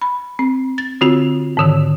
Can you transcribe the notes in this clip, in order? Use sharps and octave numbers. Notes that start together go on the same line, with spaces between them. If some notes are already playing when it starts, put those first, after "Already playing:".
B5
C4
A6
D3 C4 F4 F#4
G#2 D3 D#3